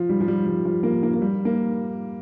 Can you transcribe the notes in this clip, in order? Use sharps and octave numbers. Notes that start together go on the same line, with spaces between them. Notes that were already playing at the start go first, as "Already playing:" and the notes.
Already playing: F3
G3
F3
G3
G3
F3
A#3
A#3
A#3
G3
A#3